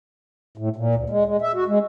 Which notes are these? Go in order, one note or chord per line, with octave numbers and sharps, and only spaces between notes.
A2
A#2
D2
G#3
G#3
E5
F#4
G#3